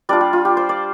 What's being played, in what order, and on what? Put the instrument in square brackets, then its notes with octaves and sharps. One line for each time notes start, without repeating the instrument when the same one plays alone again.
[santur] G3 D4 F4 D5
G4
F4
G4
C5
D5